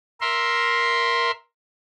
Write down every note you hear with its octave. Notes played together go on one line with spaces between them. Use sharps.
A#4 E5 C6